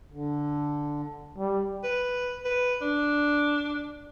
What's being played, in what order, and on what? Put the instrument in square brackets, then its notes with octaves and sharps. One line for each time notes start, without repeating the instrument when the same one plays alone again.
[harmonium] D3
[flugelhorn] G3
[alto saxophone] B4
B4
D4